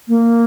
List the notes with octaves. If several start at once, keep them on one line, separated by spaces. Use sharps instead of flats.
A#3